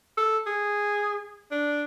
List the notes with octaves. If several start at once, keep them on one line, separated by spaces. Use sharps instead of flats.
A4
G#4
D4